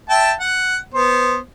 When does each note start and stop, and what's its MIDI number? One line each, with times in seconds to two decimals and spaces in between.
0.10 0.32 76
0.10 0.32 79
0.10 0.32 81
0.40 0.77 78
0.94 1.37 59
0.94 1.37 72